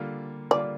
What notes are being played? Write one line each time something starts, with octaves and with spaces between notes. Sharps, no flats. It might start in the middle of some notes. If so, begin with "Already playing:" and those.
Already playing: D3 G3 A#3 F4
D3 G3 A#3 F4 D5